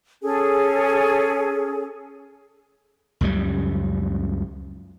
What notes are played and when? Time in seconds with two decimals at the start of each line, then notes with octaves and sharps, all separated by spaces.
0.23 C#4 G#4 A4
3.21 C#2 F#2 C#3 G3